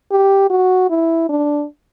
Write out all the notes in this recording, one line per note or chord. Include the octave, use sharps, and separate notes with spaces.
G4
F#4
E4
D4